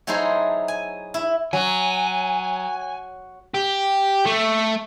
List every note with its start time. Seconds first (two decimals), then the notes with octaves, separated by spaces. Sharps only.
0.07 F#3 D#4 E4 G#4 A4 C5
0.68 G#5
1.14 E4
1.53 F#3 G#5
3.54 G4
4.25 A3